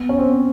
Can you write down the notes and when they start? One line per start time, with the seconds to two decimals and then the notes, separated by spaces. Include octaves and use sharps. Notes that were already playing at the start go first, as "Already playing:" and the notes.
Already playing: B3
0.09 C#4
0.18 C4